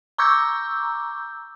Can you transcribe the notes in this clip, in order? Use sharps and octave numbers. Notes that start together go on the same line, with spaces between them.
A#5 C#6 D6 E6 G6